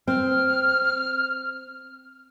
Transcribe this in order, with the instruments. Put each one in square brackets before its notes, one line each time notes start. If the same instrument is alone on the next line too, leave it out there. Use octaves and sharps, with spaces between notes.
[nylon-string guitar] C4 [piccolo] F6